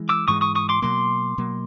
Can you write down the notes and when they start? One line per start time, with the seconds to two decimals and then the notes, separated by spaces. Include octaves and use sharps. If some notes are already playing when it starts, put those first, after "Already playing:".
Already playing: E3 G#3
0.09 D6 E6
0.28 G#2 E3 G#3 C#6 D#6
0.41 C#6 D#6
0.55 C#6 D#6
0.69 C6 D6
0.82 B2 F#3 A#3 C6 D6
1.38 B2 F#3 A#3